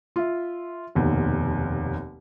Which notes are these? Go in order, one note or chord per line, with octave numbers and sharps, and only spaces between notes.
F4 E5
F1 D#2 B2